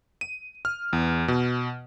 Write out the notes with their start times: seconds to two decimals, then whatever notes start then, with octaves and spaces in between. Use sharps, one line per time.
0.21 D#7
0.65 F6
0.93 E2
1.28 B2